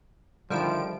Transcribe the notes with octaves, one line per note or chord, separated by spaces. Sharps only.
D3 D#3 F3 G3 E4 G5 D7